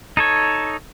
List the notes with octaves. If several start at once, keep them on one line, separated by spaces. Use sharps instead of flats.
D#4 A4 C#5